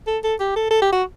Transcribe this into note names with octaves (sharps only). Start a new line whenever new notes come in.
A4
A4
G4
A4
A4
G4
F#4